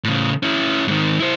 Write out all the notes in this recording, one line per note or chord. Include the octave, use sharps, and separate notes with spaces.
A2 C#3
C#4 E4
G#2 D#3
E4 C5